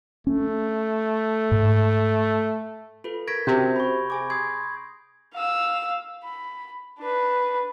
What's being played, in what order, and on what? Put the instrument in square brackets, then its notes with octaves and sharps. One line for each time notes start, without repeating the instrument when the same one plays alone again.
[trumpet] A3 [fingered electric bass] C#4
[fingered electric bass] G#2
[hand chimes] F4 A4 B4
[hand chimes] A#4 C#6 B6 [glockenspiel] G#6 A#6 D7
[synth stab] C3 [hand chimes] C#4 F#4 C5 [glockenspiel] G6
[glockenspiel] B5 C#6
[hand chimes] G#4 G#5 D6
[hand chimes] C6 C7 [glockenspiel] D#6 G#6
[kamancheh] F5 E6
B5
D4 B4